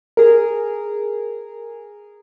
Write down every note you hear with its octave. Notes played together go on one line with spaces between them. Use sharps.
G#4 A#4